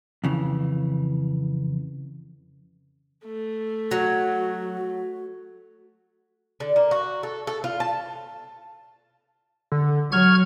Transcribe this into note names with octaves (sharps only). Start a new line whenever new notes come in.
F2 C#3 E3
A3
F#3 F#4
D3
A#3
F#4
A4
A4
F4
A5
D3
F#3 C#6 F6 G#6